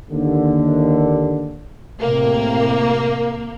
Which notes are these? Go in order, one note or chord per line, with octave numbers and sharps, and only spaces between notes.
D#2 D3
A2 C3 A#3